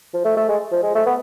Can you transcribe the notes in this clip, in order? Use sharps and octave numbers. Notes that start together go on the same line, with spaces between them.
F3
A3
A3
G#3
F3
G#3
A3
B3